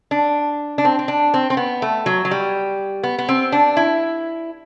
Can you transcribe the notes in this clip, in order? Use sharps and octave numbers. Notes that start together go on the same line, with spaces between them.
D4
D4
C4
C4
D4
C4
C4
B3
A3
F#3
F#3
G3
B3
B3
C4
D4
E4